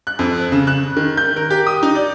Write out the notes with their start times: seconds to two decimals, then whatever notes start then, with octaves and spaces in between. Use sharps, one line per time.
0.07 F#6
0.19 F2
0.52 C#3
0.67 F#6
0.97 D#3
1.17 G6
1.36 A#4
1.50 G4
1.67 D#6
1.83 D#4
1.95 D5